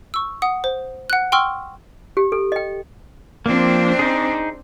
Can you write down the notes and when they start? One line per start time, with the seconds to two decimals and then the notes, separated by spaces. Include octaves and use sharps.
0.14 C#6 E6
0.42 F#5 D#6
0.64 C5
1.10 F#5 F#6
1.32 G5 C6 C#6 E6 F6
2.17 G4
2.32 A4
2.52 D#5 G5
3.46 F3 A#3 C4 D4
3.99 D#4 G#4